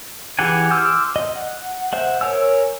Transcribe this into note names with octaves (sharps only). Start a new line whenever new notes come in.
E3 G4 G#4 F#5 G#5
C6 D6 E6 F6 G6
D#5
F#5
C5 E5 F#5
A#4 C#5 G#5 E6